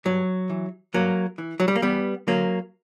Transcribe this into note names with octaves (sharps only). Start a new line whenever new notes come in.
G2 F#3
E3
G2 F#3 A#3
E3
F#3
G3
A#3
E2 G3 B3
D3 F#3 A#3